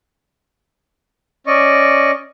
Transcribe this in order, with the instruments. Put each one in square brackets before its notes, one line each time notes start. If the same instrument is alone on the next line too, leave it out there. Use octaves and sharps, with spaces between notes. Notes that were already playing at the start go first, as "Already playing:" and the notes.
[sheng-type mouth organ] C#4 D5 D#5 C#6